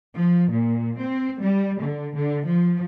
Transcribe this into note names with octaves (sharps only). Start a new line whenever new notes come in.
F3
A#2
C4
G3
D3
D3
F3